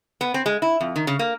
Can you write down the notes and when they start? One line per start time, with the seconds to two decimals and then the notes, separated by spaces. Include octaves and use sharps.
0.21 B3
0.34 C4
0.46 G#3
0.62 E4
0.81 F2
0.96 D#3
1.07 C#3
1.19 A#3